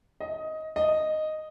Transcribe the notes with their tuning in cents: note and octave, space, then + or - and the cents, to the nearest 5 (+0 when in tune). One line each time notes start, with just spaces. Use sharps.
D#5 +15
D#5 -5